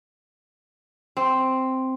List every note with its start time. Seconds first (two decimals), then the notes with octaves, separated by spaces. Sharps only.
1.17 C4